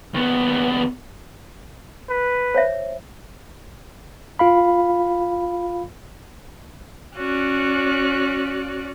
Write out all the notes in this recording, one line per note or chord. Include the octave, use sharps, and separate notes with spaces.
D#2 B3
B4
C5 C#5 E5
F4 F5 B5
C#4 F#4 D5 F#6